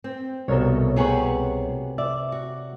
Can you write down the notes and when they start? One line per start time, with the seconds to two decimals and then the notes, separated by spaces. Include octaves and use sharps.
0.04 C4
0.48 C2 B2 A4 A#4 C#5
0.96 C3 B3 G#4 C#5 F#5 C#6
1.98 D5 E5
2.32 F#4